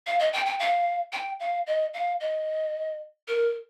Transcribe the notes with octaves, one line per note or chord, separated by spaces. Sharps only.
F5
D#5
G5
G5
F5
G5
F5
D#5
F5
D#5
A#4